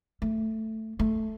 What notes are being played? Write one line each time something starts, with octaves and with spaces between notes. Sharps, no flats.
A3
A3